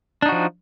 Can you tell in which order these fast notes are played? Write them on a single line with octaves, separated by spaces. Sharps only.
D4 D#4 F#4 F3